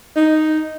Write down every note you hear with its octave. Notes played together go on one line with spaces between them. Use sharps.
D#4